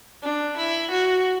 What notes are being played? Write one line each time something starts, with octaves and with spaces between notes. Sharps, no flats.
D4
E4
F#4